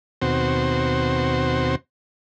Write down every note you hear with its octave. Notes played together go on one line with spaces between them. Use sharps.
D#2 B2 C4 F#4 C5